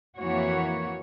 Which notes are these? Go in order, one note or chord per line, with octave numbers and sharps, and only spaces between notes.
F2 E3 A#3 F#4 C#5